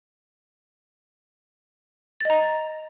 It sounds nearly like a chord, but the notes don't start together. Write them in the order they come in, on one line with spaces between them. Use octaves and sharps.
A6 D#5 A#5